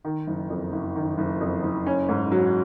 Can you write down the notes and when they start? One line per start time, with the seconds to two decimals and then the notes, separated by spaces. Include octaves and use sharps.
0.05 D#3
0.27 F#1
0.50 F2
0.72 F#1
0.96 D#3
1.18 F#1
1.41 F2
1.63 F#1
1.86 C#4
2.09 G#2
2.32 F#3